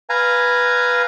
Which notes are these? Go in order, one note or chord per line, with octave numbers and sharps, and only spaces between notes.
B4 F5 G#5 A#5